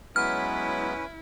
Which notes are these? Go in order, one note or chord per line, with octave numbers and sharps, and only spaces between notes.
F#3 G#3 B3 C#4 E4 B4 F6